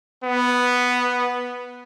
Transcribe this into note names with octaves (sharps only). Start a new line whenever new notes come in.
B3